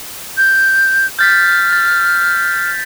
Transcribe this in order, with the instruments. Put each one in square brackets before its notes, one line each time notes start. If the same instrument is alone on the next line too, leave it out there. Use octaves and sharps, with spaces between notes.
[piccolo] G6
[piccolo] F6 [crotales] G6 A6 B6
[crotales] A6